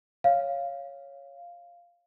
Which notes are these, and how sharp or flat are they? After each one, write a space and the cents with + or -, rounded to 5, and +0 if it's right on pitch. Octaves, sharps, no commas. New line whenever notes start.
C#5 +0 F5 -5